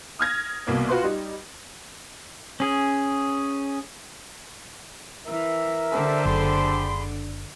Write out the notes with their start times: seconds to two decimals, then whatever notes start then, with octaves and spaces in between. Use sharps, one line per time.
0.19 D#6 F6 G#6 A#6
0.67 C2 B2 A#3 B3
0.89 F4 F#4 B4 C6
1.03 G3 D#4
2.60 C#4 G#4
5.26 E3 A#4 E5
5.93 D3 G4 A4 C5 D5
6.25 F#1 G#4 B5 C6